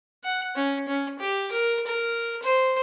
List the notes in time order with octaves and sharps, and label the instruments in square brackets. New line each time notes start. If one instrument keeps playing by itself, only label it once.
[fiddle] F#5
C#4
C#4
G4
A#4
A#4
C5